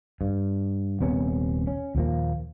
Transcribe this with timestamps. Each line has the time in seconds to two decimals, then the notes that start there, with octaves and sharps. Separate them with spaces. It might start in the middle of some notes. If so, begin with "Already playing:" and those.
0.21 G2
1.00 D#1 C3 B3 C#4
1.67 C#4
1.95 D#2 A#2 F3 A#3